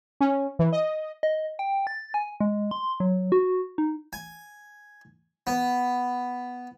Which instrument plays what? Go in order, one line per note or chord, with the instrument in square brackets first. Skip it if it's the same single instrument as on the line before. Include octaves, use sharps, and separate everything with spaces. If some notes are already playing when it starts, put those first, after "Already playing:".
[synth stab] C#4
E3
D#5
[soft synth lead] D#5
G5
A6
G#5
G#3
C6
F#3
F#4
D#4
[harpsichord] G#5
B3